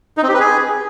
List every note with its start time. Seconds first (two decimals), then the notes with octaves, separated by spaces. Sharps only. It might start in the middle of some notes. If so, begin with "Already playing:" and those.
0.17 D#4
0.23 C4
0.29 G4
0.34 B4
0.40 G#4